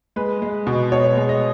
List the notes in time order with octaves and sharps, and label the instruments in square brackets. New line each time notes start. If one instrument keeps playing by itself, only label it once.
[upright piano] G#3 B4
G#3
B2
B2 C#5
G#3
D#5